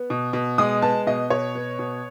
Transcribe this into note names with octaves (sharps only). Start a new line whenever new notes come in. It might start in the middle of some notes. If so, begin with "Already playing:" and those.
Already playing: B3
B2
B2
G#3 D#6
B3 A5
B2 D#5
B2 C#5
B3
B2